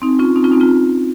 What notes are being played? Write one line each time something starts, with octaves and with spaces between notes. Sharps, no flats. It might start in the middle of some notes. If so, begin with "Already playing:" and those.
C4 D#4
C#4 F4
C4 D#4
C#4 F4
C4 D#4
C#4 F4